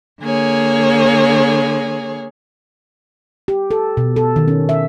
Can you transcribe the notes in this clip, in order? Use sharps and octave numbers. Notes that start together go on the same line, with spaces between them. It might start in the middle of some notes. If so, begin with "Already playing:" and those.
D3 A#3 G#4 C#5
G4
A4
B2
A4
D#3
C#4
E5